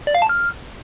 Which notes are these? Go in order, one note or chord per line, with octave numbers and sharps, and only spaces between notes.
D5
F5
A5
F6